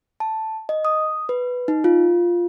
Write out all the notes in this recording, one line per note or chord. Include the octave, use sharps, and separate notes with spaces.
A5
D#5
D#6
B4
D#4
F4